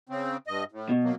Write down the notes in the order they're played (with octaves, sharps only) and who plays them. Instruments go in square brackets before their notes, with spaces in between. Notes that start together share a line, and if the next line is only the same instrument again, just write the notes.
[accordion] C#3 C4
G2 D#5
A2
[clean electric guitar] B2
[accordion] F#3 A#3